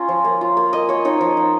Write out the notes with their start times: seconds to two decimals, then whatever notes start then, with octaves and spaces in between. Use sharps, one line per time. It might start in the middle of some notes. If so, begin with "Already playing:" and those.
Already playing: C#4 F4 A#5 C6
0.09 F3
0.24 A#3
0.41 F4
0.57 A#3
0.73 A#3 D#5
0.89 A#3 C#5
1.05 D#4 C#5
1.21 F3
1.37 D#4